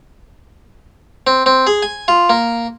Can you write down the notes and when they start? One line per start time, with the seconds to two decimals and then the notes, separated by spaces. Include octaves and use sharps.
1.27 C4
1.46 C4
1.67 G#4
1.83 G#5
2.08 F4
2.30 A#3